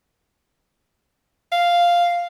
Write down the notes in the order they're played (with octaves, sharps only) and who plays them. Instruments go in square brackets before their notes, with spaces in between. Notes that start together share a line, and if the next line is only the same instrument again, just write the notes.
[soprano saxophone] F5